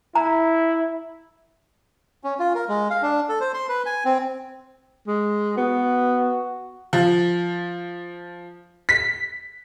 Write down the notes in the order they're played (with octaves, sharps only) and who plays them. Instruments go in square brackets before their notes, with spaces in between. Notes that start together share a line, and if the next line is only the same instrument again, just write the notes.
[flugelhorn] E4 [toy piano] A#5
[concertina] C#4
F4
A#4
G#3
F5
D4
A4
C5
C6
B4
G#5
C4
[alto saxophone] G#3
[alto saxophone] B3 [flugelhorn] F#4
[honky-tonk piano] F3
B6